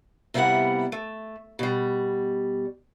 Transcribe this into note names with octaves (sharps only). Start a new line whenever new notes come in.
C3 G3 A#3 B3 E4 F#5
A3
B2 G3